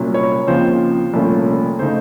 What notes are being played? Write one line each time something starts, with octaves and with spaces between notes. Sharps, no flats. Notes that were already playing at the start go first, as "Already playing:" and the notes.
Already playing: C2 A#2 F#3 A#3 C#4
C#5
D#2 C#3 F3 C4 C5
C2 A#2 F3 A3 C#4
C#3 A3 D#4 C5